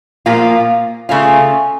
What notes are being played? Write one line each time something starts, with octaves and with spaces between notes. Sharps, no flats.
A#2 F3 A#3 F4
C#3 A3 C#4 F4